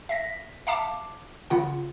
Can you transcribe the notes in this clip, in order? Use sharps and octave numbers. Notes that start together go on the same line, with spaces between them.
E5 A#6 B6
E5 F5 A5 D6
C#3 F4 F#5